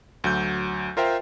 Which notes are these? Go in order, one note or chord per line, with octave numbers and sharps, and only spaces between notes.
D2 F#3 G6
F4 A#4 C5 E5 G5